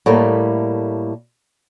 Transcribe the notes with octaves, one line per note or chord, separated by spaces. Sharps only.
A2 G3 A3 A#3